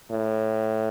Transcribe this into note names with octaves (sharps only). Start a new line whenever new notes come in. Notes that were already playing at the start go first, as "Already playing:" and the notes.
A2